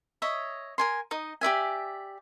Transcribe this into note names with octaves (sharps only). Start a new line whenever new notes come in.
C#5 D#5 E5
A#4 G#5 C6
D#4 D#5
G4 D5 E5 G#5